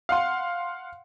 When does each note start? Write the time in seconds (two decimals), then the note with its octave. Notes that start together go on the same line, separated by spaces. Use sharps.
0.09 F5 F#5 C6